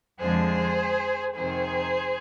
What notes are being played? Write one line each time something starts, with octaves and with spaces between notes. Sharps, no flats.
F2 D3 F3 G#3 D4 G#4 C5
F2 C3 D#3 G#4 C5